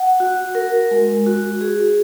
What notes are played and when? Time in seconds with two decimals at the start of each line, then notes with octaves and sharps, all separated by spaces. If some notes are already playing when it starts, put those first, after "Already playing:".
Already playing: F#5
0.20 F#4
0.55 A#4
0.91 G#3
1.26 F#4
1.61 G#4